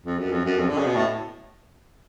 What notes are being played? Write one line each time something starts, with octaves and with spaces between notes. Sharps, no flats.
F2
F#2
F2
F#2
F2
D3
C#3
B2
A2